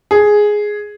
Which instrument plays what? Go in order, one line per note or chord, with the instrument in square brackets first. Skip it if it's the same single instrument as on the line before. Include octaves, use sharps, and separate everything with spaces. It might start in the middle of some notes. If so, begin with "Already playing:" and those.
[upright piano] G#4